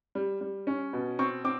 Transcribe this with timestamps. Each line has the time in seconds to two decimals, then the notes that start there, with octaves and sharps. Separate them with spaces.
0.15 G3
0.41 G3
0.67 C#4
0.93 B2
1.19 C4 C#6
1.44 C4 D6